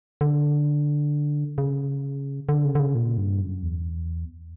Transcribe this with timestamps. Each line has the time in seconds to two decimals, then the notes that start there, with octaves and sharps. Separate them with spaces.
0.21 D3
1.58 C#3
2.49 D3
2.65 C#3
2.75 D3
2.80 C#3
2.95 A#2
3.17 G2
3.41 F#2
3.63 E2